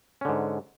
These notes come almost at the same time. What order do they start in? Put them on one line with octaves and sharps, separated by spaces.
C#4 D3 G#2